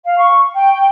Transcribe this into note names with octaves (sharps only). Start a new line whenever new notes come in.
F5
C#6
G5